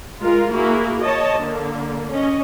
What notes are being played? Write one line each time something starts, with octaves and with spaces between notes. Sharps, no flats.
G#3 F4 A#4
A#3 E4 F#4 G#4
C#5 D#5 A5
D3 A#3
C#4 D#5